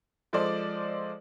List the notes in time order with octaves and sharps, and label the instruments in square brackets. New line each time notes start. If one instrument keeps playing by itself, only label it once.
[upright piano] F3 G#3 A4 C5 D5